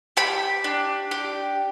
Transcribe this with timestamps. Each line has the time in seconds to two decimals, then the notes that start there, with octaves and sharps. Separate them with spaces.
0.17 G4 B5
0.64 D4
1.11 G4